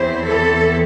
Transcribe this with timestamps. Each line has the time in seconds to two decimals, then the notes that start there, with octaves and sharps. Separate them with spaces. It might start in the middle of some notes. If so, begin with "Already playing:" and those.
Already playing: E2 E3 C4 E4 C5
0.25 A4